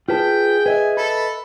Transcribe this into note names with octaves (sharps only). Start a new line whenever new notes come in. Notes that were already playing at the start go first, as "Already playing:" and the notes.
F4 G#4 B4 G5 A5
B4 D#5 E5 G#5
A4 B5